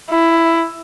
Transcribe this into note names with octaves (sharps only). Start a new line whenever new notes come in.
E4